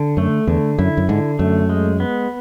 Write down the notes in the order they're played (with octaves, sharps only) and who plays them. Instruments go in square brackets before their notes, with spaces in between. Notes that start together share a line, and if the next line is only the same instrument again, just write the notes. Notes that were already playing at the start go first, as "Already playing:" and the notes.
Already playing: [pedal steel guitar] D3
[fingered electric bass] F#2 [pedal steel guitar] A3
[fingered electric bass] E2 [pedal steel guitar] D3
[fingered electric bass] F#2 [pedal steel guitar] E4
[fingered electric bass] F#2
[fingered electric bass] G#2 [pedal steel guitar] D3
[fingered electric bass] F#2 [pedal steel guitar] A3
[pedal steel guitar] G#3
B3